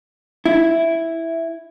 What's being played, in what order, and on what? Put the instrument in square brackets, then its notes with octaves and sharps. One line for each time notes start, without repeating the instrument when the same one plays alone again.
[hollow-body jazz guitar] E4